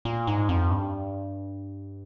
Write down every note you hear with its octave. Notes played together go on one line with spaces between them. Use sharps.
A#2
G#2
F2
G2